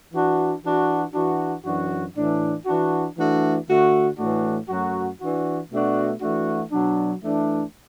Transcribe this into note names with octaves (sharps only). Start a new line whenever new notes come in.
E3 D4 F#4
E3 D4 F#4
E3 D4 F#4
F#2 E3 D4 F#4
A2 E3 D4
E3 D4 F#4
E3 A3 D4 F#4
D3 A3 F#4
A2 E3 A3 D4 F#4
F#2 F#3 A3 F#4
E3 D4 F#4
B2 A3 D4 F#4
E3 A3 D4 F#4
B2 F#3 D4
E3 A3 D4